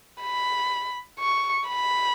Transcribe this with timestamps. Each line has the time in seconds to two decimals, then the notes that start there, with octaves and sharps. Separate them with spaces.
0.21 B5
1.20 C#6
1.68 B5